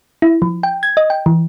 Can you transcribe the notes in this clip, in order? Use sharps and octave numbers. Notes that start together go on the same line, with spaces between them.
E4
F3
G5
G#6
D#5
G5
E3